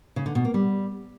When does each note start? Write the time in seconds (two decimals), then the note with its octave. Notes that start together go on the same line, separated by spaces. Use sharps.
0.16 C#3
0.26 D3
0.35 B2
0.45 A#3
0.54 G3